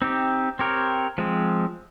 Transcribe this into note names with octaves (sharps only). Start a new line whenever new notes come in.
C4 D#4 G4
C4 G4 A#4 C#5
F3 G#3 C4